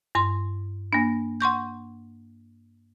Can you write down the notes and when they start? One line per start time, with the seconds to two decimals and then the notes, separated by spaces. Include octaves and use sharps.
0.15 G2 C6
0.93 A#3 D4
1.41 F#5 C6 C#6 G6